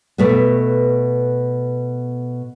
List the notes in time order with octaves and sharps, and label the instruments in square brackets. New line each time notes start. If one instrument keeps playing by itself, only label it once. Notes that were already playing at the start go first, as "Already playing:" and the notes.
[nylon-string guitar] B2 A3 B3